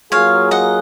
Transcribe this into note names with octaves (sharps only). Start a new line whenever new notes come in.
F#3 A#3 F4 G#4 C#5 F5
D#5 F#5